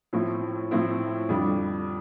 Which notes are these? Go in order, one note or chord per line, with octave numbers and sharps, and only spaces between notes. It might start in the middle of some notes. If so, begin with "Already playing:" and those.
A2 F3 C4 E4
A2 F3 C4 E4
F2 D3 G3 D4